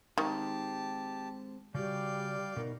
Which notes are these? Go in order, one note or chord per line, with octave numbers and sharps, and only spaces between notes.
D#3 G#3 C4 G4 A5
C#3 G3 F#4 G4 D5 F5 G6
B2 B3 D#4 A#4